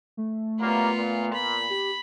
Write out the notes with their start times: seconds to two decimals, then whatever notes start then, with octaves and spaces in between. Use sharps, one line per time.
0.17 A3
0.61 F#3 G3 A#3 B3 F4
0.96 A#2
1.34 B5
1.70 G4